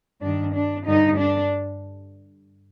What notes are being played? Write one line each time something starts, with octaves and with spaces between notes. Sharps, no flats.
G2 D#3 D4
D4
G2 D3 D#4
D4